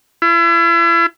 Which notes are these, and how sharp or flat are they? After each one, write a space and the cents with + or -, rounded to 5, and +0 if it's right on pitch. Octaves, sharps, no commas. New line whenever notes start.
E4 +40